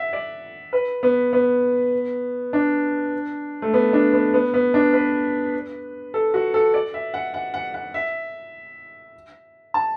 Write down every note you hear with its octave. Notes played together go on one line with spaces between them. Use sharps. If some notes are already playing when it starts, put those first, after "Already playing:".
Already playing: E5 F#5
D5
B4
B3
B3
D4
A3
B3
D4
B3
B3
B3
D4
B4
A4
F#4
A4
D5
E5
F#5
F#5
F#5
F#5
E5
A5